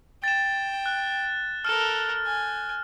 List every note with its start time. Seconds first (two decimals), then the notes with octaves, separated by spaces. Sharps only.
0.24 G5 A6 E7
0.86 F#6
1.65 A4 A#4 F6
2.27 G#5